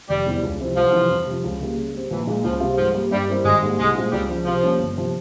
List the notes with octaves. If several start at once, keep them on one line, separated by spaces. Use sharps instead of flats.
F1 G3
E2 C3 E3
C#2
C3 F3 C4 E4
C2 F3
C3 E3 G3 C4
F2
C3 F3
C#2
C#3 G3 A#3
C#3
G3 C4
A#1 E3
A#2 G#3
C#2 F3
C3 G3 C4 F4
G#2 F3
G3 A#3
G2 G3
G3 C4 E4 A#4
G#1 G#3
G#2 G3 A#3
C2 G#3
A#2 G#3 C4 F4
C#2 G3
C#3 F3
C3 F3
G3 A#3 C#4
G1
C3 F3